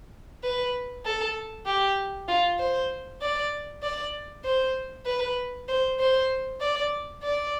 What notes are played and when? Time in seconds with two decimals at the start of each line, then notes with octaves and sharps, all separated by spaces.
0.43 B4
1.05 A4
1.66 G4
2.28 F4
2.59 C5
3.21 D5
3.83 D5
4.44 C5
5.06 B4
5.68 C5
5.99 C5
6.60 D5
7.23 D5